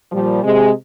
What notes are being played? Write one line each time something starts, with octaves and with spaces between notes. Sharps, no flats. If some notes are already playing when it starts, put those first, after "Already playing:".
A#2 F3 G3
C3 G#3